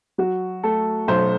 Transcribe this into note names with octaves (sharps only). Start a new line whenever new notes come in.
F#3 F#4
A3 A4
B1 C5